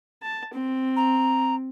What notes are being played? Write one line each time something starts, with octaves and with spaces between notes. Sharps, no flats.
A5
C4
A#5